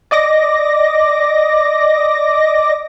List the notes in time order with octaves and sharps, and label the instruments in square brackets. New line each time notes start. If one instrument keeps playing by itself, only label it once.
[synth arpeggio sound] D5 D#5 D6 A#6